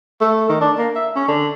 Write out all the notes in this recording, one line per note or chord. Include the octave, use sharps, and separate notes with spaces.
A3
D#3
D4
A#3
E5
C#4
D3